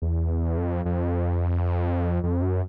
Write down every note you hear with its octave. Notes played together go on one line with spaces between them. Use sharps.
E2
F2
F2
F2
F#2